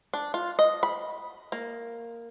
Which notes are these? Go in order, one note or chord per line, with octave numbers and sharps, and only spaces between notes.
D4
F4
D#5
B5
A#3